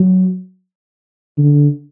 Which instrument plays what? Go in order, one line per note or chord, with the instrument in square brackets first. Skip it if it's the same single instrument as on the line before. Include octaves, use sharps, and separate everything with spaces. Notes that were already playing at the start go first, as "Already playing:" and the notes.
Already playing: [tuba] F#3
D3